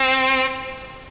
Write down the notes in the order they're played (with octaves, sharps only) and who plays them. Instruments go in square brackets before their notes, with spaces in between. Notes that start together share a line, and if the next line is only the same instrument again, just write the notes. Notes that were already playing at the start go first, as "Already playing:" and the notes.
Already playing: [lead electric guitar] C4